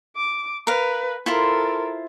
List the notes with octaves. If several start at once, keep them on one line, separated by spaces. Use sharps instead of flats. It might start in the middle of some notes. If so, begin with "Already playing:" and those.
D6
A#4 B4 F5
E4 F4 A4 A#4 C5